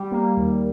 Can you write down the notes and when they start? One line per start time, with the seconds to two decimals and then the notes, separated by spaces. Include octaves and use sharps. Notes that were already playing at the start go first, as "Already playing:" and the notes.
Already playing: G3
0.12 A#3
0.37 D#2